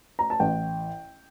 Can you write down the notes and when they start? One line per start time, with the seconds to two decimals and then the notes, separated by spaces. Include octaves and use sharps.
0.19 A#5
0.30 A5
0.40 A1 G5